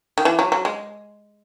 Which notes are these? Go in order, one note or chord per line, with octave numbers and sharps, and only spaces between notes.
D#3
E3
F#3
F#3
G#3